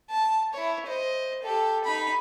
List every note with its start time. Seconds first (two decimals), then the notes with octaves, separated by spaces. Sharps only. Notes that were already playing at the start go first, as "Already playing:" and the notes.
0.10 A5
0.53 E4 C#5
0.86 C5 D#5
1.43 G4 A4
1.84 D#4 B5